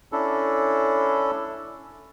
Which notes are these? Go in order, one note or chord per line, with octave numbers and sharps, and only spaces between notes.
C#4 D4 E4 A4